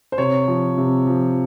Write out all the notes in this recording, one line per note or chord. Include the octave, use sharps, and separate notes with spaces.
C5
C3 C#5
F3
C3
F3